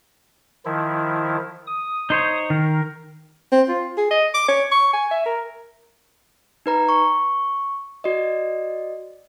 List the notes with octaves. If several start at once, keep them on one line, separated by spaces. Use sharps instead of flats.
D#3 F3 E4
D#6
D#4 C5 C#5
D#3 A#4
C4
F4
G#4
D#5
D6
C#5
C#6
G#5
E5
A#4
D#4 B4 A#5
C#6
F#4 D5 D#5